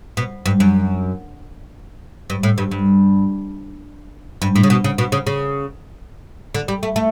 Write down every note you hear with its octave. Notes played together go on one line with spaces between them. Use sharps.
B2
G2
F#2
G2
A2
G2
G2
G2
A2
C#3
B2
C#3
B2
C#3
C#3
D3
G3
A3
A3